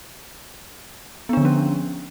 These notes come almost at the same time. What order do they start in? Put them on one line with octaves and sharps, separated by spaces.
B3 D4 D3 F3 C#4